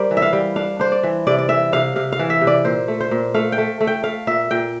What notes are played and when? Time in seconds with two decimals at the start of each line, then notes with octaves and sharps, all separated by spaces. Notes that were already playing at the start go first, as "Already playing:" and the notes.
Already playing: G3 A#4 C5 D5
0.11 E3
0.17 E5
0.22 F5
0.33 G3
0.56 D4 F5
0.79 D4 C5
0.92 D5
1.03 E3
1.27 C3 D5
1.38 D5
1.49 E3 E5
1.72 C3 F5
1.96 C3 F5
2.12 F5
2.19 E3
2.30 E5
2.41 C3
2.47 D5
2.65 A#2 C5
2.88 A3
3.00 C5
3.11 A#2
3.34 A3 F5
3.52 G5
3.58 A3
3.80 A3
3.87 G5
4.04 A3 F5
4.27 A#2 E5
4.51 A#2 G5